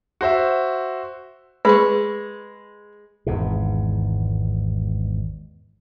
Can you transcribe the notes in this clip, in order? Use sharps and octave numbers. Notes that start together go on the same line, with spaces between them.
F#4 C5 E5
G#3 B4 B5 C#6
G#1 E2 G#2 B2